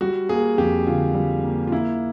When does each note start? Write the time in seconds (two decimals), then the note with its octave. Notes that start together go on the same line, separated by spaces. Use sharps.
0.01 G3 F#4
0.29 A#3 G#4
0.58 F2 G4
0.87 D3 F4
1.14 G3
1.44 A#3
1.67 F4
1.72 A#3 E4